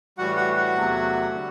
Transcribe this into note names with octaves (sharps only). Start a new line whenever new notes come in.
A2 E3 G3 F#4 F#5
F#4 F#5
F#4 F#5
E2 C3 F#3 A3
D3 G3